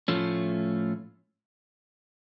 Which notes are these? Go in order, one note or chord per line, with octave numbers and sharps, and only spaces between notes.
A2 F3 A3 C#4 F4